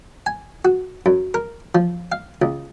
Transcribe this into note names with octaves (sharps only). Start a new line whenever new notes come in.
G#5
F#4
F#2
A#4
F3
F5
C#2